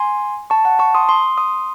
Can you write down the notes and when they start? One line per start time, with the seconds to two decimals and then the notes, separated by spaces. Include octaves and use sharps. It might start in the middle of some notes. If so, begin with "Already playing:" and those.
Already playing: G#5 C6
0.50 A5 C#6
0.65 F#5 A5
0.79 A5 C#6
0.95 C6 D#6
1.08 C6 D#6
1.38 C6 D#6